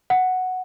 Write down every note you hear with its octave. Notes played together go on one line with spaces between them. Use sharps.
F#5